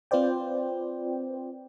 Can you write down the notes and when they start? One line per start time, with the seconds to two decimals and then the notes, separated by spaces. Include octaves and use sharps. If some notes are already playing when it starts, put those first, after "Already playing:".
0.11 C4 F4 B4 C5 D5 G5